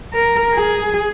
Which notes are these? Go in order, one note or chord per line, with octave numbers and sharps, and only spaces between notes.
A#4
G#4